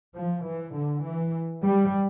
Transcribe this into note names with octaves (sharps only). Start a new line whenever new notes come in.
F3
E3
D3
E3
G3